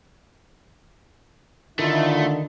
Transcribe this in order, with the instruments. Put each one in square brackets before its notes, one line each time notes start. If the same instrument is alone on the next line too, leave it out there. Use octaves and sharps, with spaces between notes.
[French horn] D3 [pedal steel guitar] D#3 [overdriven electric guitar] A3 [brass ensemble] E4 F4